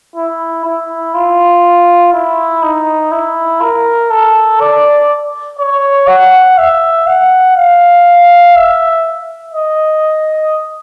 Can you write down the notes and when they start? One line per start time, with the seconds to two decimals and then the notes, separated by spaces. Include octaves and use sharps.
0.16 E4
0.65 E4
1.15 F4
2.13 E4
2.63 D#4
3.12 E4
3.62 A#4
4.11 A4
4.61 D5
5.59 C#5
6.08 F#5
6.58 E5
7.07 F#5
7.57 F5
8.56 E5
9.54 D#5